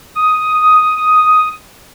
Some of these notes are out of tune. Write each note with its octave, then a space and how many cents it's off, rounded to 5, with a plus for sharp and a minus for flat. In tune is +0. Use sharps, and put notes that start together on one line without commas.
D#6 +5